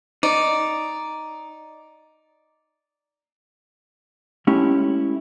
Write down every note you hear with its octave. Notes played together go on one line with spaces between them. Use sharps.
D#4 D5
G#3 A3 C#4 E4 G4